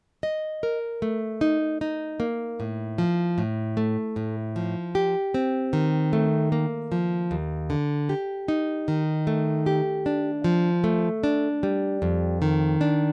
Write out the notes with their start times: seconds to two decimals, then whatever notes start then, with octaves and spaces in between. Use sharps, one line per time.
0.23 D#5
0.63 A#4
1.02 A3
1.41 D#4
1.81 D#4
2.20 A#3
2.60 A2
2.98 F3
3.38 A2
3.77 A3
4.16 A2
4.56 F3
4.95 G4
5.34 C4
5.73 D#3
6.13 A3
6.52 A#3
6.92 F3
7.31 D#2
7.70 D3
8.09 G4
8.48 D#4
8.88 D#3
9.27 A3
9.66 G4
10.06 D4
10.44 F3
10.84 A3
11.24 D4
11.63 G3
12.02 F2
12.42 D#3
12.81 D4